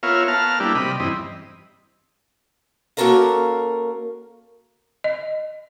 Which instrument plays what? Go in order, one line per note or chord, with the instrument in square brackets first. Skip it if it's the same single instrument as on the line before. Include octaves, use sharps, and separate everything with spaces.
[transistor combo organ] B3 F4 A#4 C#5 E5 F5
B3 A#4 F5 A5 F6
G3 A#3 B3 D4 E4 G4
C3 G3 D#5 B5
G2 E3 C4 D#5
[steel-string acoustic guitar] A#3 C#4 F#4 A4 A#4 F5
[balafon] D#5